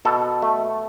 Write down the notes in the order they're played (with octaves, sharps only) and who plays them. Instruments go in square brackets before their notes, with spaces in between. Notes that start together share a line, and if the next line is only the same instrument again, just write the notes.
[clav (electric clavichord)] B2 A4
A3